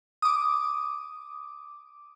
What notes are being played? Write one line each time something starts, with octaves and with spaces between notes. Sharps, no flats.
D6 D#6